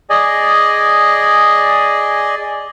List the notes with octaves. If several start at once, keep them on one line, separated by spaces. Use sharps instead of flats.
G#4 D5 D#5 G#5